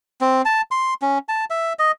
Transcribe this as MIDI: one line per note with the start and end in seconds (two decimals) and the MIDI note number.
0.21 0.42 60
0.45 0.61 81
0.71 0.94 84
1.02 1.18 61
1.29 1.45 81
1.50 1.73 76
1.79 1.92 75